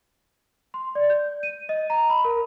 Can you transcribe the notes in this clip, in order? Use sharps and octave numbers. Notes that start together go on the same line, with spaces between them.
C6
D5
G6
D#7
D#5
A#5
B5
A#4